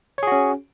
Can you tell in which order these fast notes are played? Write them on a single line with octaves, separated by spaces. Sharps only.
C#5 G#4 F#4 C#4